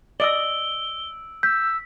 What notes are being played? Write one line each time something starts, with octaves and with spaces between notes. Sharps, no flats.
D5 D#5 E6 D7 F#7 G7
E6 G6 B6